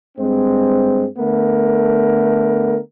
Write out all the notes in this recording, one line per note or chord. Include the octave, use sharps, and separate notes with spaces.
G2 G#3 C4
D3 A3 B3 A#4